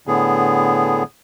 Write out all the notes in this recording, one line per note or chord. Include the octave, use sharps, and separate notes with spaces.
A2 D3 B3 G#4